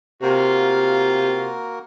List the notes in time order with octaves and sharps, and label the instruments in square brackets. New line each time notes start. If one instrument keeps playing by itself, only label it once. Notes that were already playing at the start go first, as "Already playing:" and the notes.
[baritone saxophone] C3 [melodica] A#3 F#4 A#4 [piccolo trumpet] F4